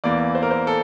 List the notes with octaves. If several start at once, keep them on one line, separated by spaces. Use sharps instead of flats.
E2 E3 A#3 D5
C5
A#4
C5
A4